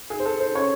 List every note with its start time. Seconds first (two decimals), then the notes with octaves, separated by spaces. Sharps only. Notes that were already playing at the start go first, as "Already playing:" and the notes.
0.10 D#4 G#4
0.20 C5
0.25 A4
0.40 C5
0.54 C#4 C#5